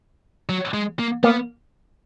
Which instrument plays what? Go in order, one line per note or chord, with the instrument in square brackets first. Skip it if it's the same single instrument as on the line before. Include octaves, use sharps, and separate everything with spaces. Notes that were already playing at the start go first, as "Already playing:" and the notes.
[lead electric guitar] F#3
G#3
A#3
[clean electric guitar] A#3 [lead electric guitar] B3